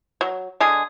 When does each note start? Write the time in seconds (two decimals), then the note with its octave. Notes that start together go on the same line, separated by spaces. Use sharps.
0.21 F#3
0.60 D3 G#3 G#4